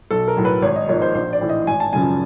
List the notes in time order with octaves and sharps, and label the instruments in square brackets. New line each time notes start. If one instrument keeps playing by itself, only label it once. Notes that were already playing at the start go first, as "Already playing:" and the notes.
[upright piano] B1 A4
A#4
A2 F#3
B4
G#1 C#5
D#5
G#2 F3 A#3 D#4 C#5
C5
A#1 C5
D5
A2 E3
D#5
G#1 G#5
A5
F#2 C#3 F3 G#5